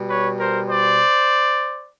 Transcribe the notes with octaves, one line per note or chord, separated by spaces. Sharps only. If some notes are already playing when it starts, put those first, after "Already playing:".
Already playing: B2 G3
B4 C#5
A#4 C5
C5 D5